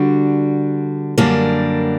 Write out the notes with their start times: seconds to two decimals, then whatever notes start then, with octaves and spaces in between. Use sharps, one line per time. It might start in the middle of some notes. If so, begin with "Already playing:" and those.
Already playing: D3 G3 D4 F#4
1.18 F#2 D3 G3 A#3 D4